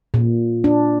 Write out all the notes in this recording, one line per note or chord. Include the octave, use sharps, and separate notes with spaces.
A#2
D4